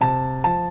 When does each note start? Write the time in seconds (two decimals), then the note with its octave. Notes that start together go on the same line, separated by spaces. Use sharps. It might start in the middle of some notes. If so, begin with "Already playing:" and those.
0.01 C3 A5
0.44 F3 A5